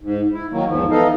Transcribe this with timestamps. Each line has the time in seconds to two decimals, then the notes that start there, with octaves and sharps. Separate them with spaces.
0.02 G#2
0.33 E4
0.52 D#3 F#3 A#3
0.68 E2 G#2 F3
0.91 E3 B3 D#4 A4 D#5 F5